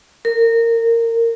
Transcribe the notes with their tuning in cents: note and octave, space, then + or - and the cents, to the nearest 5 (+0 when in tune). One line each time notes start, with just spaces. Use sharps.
A#4 -20